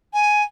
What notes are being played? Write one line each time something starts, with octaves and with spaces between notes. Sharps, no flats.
G#5